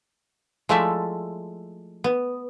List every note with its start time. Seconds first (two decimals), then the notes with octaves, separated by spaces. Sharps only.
0.69 F3 G#3 A3 E4 D5 E5
2.04 B3